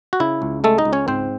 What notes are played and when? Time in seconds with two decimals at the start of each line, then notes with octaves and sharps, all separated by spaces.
0.13 F#4
0.20 C#3 E4
0.42 C#2
0.64 G#3 A3 A4
0.78 D#4 D#5
0.85 C#2
0.93 C#4 C#5
1.08 G#2 C4 C5